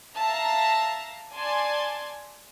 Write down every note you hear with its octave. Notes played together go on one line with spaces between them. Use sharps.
E5 F5 A5 A#5 A#6
D5 G#5 A5 C6